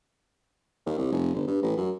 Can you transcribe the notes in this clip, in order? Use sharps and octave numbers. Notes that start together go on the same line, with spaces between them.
D#2
C2
F1
G1
G2
A1
F#2